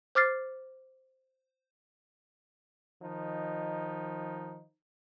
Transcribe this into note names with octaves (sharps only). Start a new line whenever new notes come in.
C5 D6 F6 A6 C7
D#3 F3 D#4